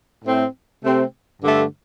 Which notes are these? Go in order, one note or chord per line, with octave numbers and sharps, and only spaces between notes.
A2 A3 C4 E4
C3 A3 C4 G4
G2 D3 A3